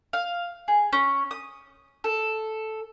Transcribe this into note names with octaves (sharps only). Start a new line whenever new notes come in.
F5
G#4
C#4
D#6
A4